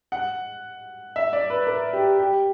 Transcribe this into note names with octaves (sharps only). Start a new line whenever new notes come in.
F#5
E5
D5
B4
A#4
G4
G4